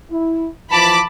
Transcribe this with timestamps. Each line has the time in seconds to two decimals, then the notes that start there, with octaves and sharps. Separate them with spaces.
0.10 E4
0.71 E3 F3 A5 B5 D6